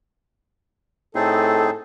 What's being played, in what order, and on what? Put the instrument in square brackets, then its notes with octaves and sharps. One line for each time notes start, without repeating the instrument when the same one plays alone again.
[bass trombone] A2 [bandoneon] C4 D#4 G#4 [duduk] A4